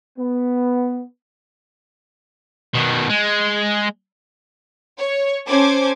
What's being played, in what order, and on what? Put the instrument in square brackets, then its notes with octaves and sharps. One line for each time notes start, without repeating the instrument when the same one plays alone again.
[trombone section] B3
[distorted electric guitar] B2 D#3
G#3
[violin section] C#5
C#4 A4 C5 D6 G#6